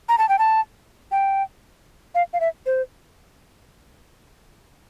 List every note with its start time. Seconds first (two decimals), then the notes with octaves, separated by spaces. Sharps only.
0.09 A#5
0.18 A5
0.29 G5
0.39 A5
1.12 G5
2.15 F5
2.33 F5
2.40 E5
2.66 C5